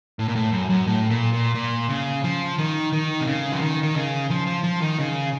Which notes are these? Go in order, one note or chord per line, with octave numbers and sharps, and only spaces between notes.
A2
A#2
A2
F#2
F#2
A2
A#2
A#2
A#2
C#3
F3
D#3
D#3
C3
C#3
F3
D#3
D#3
C#3
F3
F3
F3
D#3
C#3